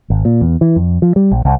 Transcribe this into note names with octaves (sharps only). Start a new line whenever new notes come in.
G#1
A#2
E2
E3
F2
F3
G3
A#1
C2